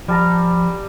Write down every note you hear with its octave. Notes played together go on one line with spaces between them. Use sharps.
F3 G3 A5 A#5